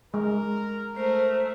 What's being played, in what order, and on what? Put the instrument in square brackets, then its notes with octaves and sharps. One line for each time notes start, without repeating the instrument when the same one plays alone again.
[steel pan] G#3 [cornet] A#4
[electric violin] A3 [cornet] A#4 [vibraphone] C5